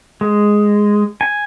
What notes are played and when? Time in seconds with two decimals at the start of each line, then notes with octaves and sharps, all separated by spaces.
0.21 G#3
1.21 G#5